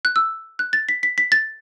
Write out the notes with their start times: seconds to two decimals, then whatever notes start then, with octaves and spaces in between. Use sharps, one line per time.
0.05 F#6
0.16 E6
0.59 F#6
0.73 A6
0.89 B6
1.03 B6
1.18 B6
1.32 A6